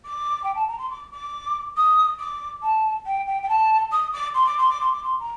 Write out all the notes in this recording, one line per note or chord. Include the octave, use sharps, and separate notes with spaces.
D6
G5
A5
A#5
C6
D6
D6
D#6
D6
A5
G5
G5
G5
A5
D#6
D6
C6
D6
C6
D6
C6
D6
C6
A#5